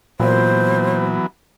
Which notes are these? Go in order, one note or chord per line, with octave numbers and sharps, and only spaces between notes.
A#2 E3 F#3 B3 C5